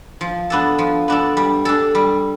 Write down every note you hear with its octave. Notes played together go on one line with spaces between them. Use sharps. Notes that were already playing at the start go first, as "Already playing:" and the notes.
F3
B3 D4 A4
F3
B3 D4 A4
G3
D4 A4
G3